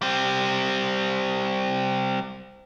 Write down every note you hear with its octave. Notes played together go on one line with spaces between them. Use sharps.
G3 C4